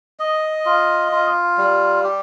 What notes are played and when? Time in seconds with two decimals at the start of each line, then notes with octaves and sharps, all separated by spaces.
0.20 D#5
0.66 F4
1.12 F4
1.58 G3
2.04 G4